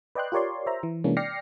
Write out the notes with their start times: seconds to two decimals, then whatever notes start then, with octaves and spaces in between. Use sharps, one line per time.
0.15 B4 D5 D#5 G5 C6 F#6
0.32 F4 G4 A#4 C#5 D5 C6
0.66 C5 E5 A#5
0.83 E3
1.04 C3 E3 G#3 A#3 C#4 D4
1.17 D5 G5 F6 A#6 C7 C#7